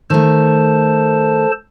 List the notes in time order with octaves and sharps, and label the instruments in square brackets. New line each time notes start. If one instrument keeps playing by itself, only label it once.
[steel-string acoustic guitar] D#3 A3 [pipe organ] A4 C5 A5